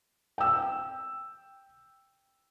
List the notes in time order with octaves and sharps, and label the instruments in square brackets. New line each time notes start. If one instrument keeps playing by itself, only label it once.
[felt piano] G5 E6